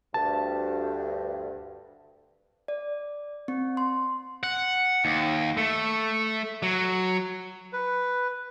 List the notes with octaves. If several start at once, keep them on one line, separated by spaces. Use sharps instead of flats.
D2 G2 A5
D5
C4
C6
F#5
D#2
A3
F#3
B4